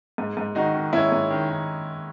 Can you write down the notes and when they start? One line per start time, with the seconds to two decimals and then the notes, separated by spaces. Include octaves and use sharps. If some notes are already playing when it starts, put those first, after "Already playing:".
0.18 G#2
0.37 G#2
0.55 D#3 D#4 F#4
0.74 D#3
0.93 G#2 C#4 E4
1.12 G#2
1.31 D#3
1.49 D#3